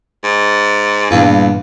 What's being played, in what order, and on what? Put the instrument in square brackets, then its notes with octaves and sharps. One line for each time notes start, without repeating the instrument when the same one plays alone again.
[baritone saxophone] G#2
[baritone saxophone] E2 [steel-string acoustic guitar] G2 A#2 E3